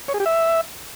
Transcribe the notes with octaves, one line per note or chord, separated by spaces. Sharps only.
C#5
G#4
G4
E5